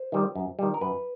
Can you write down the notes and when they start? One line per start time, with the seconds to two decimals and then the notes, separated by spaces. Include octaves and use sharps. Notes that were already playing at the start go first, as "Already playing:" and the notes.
Already playing: C5
0.12 D#3 G3
0.35 F#2
0.59 D#3 G3
0.74 A#4
0.81 F#2 B4